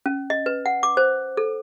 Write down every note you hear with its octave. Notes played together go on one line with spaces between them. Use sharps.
C#4
D#5
B4
F#5
D6
C5
A4